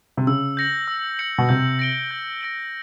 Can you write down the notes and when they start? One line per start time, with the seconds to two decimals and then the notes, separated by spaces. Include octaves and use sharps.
0.17 C3
0.27 C#3 E6
0.57 G6 A#6 C#7 F#7
0.88 E6
1.19 G6 A#6 C#7 F#7
1.38 B2
1.49 C3 G6
1.79 A#6 D7 G7
2.11 G6
2.41 A#6 D7 G7